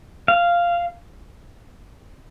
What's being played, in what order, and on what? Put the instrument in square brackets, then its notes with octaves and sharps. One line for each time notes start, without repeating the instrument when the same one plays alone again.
[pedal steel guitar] F5